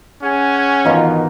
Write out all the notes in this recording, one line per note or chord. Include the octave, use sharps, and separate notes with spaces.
C#4 G#4 F#5 G#5
G#2 B2 D#3 E3 D#4 F4